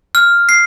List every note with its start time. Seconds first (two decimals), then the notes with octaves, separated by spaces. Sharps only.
0.15 F6
0.49 C7